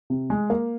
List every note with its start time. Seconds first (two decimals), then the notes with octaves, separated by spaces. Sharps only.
0.10 C3
0.30 G#3
0.50 A#3